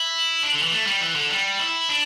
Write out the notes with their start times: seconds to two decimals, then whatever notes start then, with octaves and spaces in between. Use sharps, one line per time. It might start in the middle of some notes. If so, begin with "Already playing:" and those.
Already playing: E4
0.43 D4
0.52 D3
0.63 E3
0.71 A3
0.86 G3
1.01 E3
1.15 D3
1.30 G3
1.60 E4
1.89 D4